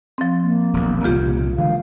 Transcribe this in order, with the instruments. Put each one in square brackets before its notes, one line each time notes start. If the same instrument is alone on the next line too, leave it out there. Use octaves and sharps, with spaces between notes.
[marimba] F3 C4
[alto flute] A#3
[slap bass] D#1 B1
[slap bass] C2 A#2 C#3 [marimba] F4 G4
[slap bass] D3 E3 G#3 [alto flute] F5